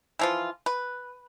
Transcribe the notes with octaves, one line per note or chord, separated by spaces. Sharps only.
E3 F3 F4
B4